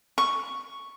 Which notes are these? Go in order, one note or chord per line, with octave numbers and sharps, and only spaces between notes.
C#6